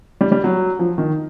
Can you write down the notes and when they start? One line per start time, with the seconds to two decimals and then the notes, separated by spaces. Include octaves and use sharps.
0.21 G3
0.32 G3
0.44 F#3
0.79 F3
0.98 D#3